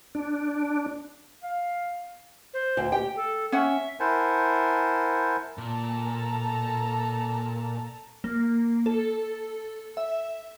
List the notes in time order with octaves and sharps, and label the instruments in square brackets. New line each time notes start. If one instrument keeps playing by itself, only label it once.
[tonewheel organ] D4
[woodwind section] F5
[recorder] C5
[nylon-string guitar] D2
[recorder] G4 [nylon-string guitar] G5
[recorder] A4
[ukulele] C#4 F#5 [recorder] E5
[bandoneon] E4 A#4 C5 F#5 G#5 A5
[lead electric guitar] A#2 [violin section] A4 A5 A#5
[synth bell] A#3
A4
E5